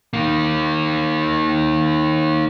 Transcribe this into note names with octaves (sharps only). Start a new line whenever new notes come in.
D#3 A#3